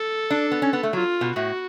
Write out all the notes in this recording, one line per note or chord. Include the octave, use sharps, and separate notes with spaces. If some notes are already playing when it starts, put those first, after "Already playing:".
Already playing: A4
D4
B3
C#4
B3
A3
F#3 F4
B2
A2 F#4